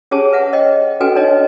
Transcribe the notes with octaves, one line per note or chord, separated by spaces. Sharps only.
C#4 G4 G#4 C#5 G#5 A5
B4 E5 F#5
C#5 D#5 G5
C#4 F#4 A4 B4 G5 G#5
D4 D#4 C#5 D#5